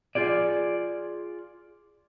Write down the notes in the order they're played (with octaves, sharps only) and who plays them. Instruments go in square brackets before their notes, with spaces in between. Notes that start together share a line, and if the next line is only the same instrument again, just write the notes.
[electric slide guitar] F4 G#4 D5